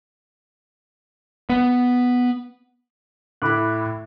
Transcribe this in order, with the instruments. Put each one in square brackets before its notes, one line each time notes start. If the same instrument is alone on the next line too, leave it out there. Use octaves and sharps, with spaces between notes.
[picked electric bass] B3
[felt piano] A2 E4 [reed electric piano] B5 D6 F#6